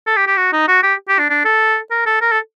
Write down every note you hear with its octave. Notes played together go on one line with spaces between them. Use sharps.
A4
G4
G4
F#4
D#4
F#4
G4
G4
D4
D4
A4
A#4
A4
A#4
A4